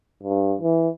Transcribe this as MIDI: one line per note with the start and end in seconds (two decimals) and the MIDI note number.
0.23 0.56 43
0.61 0.89 52